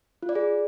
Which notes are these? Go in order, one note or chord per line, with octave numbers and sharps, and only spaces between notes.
F4
D5
G#4